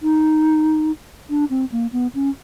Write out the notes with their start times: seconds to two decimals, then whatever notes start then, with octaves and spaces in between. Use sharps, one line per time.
0.03 D#4
1.30 D4
1.50 C4
1.72 A#3
1.92 B3
2.15 C#4